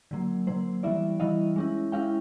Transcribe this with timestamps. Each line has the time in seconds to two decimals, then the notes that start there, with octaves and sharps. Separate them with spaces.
0.11 D3 F#3 A#3
0.47 D3 F#3 A#3 C5
0.83 E3 G3 B3 E4 D5 E5
1.20 E3 G3 B3 E4 D#5 F5
1.56 G#3 C#4 E4
1.92 G#3 C#4 E4 F5 G5